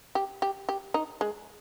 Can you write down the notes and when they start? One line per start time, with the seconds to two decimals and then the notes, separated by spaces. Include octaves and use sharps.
0.15 G4
0.42 G4
0.69 G4
0.94 D#4
1.21 G#3